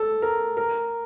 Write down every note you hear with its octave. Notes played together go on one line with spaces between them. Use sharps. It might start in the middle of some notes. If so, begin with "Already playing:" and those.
Already playing: A4
A#4
A#4